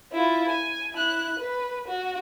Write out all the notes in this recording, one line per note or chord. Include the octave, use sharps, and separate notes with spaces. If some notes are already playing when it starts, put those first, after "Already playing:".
E4 F4
G#5
E4 F#6
B4
F#4